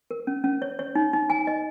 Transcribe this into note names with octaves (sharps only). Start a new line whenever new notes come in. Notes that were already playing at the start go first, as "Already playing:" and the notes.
A#4
C#4
C#4
C#5
C#5
D#4
D#4
G#5
D#5